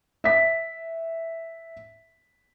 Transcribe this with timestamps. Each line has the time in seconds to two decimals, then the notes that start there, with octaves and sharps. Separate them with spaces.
0.24 E5 B6